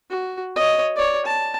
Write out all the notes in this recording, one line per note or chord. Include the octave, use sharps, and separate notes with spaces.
F#4
C#5 D#5
C#5 D5
A5